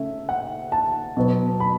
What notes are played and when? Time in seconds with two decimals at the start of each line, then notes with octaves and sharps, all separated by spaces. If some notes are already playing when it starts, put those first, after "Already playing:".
Already playing: C#3 A3 C#4 E5
0.29 F#5
0.72 A5
1.17 B2 F#3 B3
1.60 B5